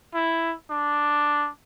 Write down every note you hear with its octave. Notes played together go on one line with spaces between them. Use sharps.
E4
D4